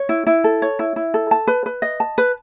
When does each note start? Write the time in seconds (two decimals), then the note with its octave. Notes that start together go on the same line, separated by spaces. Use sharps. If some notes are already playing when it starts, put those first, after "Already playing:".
Already playing: C#5
0.09 E4
0.27 E4
0.44 A4
0.62 C#5
0.79 E4
0.96 E4
1.14 A4
1.31 A5
1.47 B4
1.66 B4
1.82 D#5
2.00 A5
2.18 B4